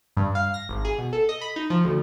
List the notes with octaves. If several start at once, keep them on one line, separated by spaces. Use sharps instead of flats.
G2
F5
A#6
G#1
G#4
B2
A4
D#5
B5
D#4
F3
D2